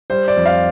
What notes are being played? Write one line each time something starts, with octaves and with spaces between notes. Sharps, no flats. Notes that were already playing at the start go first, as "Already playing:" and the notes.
G3 C5
D5
F2
F5